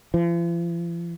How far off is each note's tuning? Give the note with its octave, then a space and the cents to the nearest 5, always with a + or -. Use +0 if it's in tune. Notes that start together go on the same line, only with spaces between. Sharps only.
F3 -45